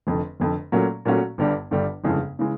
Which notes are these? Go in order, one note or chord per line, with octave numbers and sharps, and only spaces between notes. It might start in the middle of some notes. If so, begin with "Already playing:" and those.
F1 F2 D3
F1 F2 D3
A#2 F#3 A3 C#4 F#4
A#2 F#3 A3 C#4 F#4
G1 G2 D3 G3
G1 G2 D3 G3
G1 F2 C#3 E3 G#3
C#3 E3 G#3